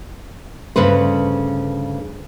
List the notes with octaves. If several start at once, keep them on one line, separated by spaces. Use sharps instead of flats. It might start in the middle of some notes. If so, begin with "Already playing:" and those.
D2 G2 C#3 C#4 B4 C5